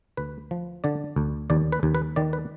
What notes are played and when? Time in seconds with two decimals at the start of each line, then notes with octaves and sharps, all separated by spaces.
0.17 D2 B4
0.51 F3
0.84 D3 D5
1.16 D2
1.50 D#2 D5
1.72 B4
1.83 D#2
1.95 B4
2.16 D#3 D5
2.33 B4